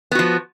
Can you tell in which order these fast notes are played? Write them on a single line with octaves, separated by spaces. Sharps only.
B3 F#4 F3